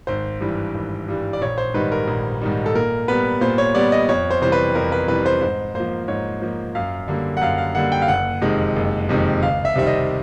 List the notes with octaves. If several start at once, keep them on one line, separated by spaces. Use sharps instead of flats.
G#1 C5
G2 E3 G3
G#1
G2 E3 G3
D5
A#1 C#5
C5
G#2 D#3 G3 B4
A#4
A#1
G#2 D#3 G3
A4
A#2 A#4
G3 B3 B4
A#2 C5
C#5
G3 B3 D5
D#5
F2 C#5
C5
C3 E3 G3 C5
B4
F2 A#4
B4
C3 E3 G3 B4
C5
G#2 C5
F3 A#3 C5
G#2 C#5
F3 A#3
F#2 F5
D3 G3 A#3
F#5
F#2 F5
F5
D3 G3 A#3 F#5
G5
F5
F#1 F#5
F2 C3 D#3 G#3
F#1
F2 C3 D#3 G#3
C#2 F5
E5
C3 D#3 G3 C4 E5
D#5